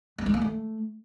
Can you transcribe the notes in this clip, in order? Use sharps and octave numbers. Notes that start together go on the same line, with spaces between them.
B3
G#3
A#3
A3